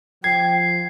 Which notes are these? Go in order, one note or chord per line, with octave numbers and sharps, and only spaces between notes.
F3 G5 G#6 C7